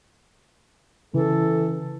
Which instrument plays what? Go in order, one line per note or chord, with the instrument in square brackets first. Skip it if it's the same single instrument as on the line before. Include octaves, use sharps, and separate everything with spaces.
[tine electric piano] C#3 [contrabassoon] E3 [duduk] A4